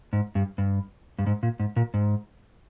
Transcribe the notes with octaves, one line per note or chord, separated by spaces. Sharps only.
G#2
G2
G2
G2
G#2
A#2
G#2
A#2
G#2